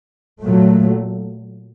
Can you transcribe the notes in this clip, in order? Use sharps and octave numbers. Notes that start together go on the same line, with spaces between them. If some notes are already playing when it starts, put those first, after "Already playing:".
A#2 F#3 A3